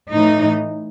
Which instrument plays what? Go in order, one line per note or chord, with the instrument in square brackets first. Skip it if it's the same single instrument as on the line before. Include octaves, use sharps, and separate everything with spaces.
[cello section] A2 E3 D#4